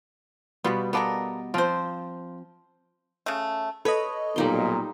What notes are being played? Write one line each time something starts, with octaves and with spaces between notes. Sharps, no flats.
B2 G3 B3 F4 F#4
B3 F4 A4 A#4 D5 D#5
F3 C4 F4 C5
C#3 A3
A4 B4 C#5 D#5 B5
B1 A#2 G3 D#4 C6